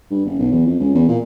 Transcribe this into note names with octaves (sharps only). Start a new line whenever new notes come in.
G2
F#1
B1
E2
F2
C#2
E2
A#2